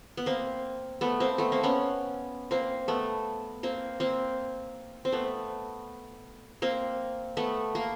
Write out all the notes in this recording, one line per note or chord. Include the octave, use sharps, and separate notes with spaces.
B3
A#3 C4
A3 B3
A#3 C4
A3 B3
A#3 C4
B3 C#4
A#3 C4
A3 B3
A#3 C4
A#3 C4
C4
A3 B3
A#3 C4
A3 B3
A#3